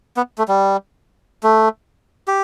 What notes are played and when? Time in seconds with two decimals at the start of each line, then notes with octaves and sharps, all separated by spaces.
0.17 B3
0.38 A3
0.48 G3
1.43 A3
2.28 G4